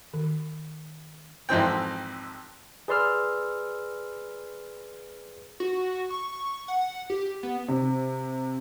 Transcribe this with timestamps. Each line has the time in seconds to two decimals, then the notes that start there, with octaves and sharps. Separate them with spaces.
0.14 D#3
1.49 G#1 F2 E3 C4 G5
2.88 G#4 B4 D5 C6 E6 F6
5.60 F#4
6.10 C#6
6.68 F#5
7.10 G4
7.43 B3
7.68 C3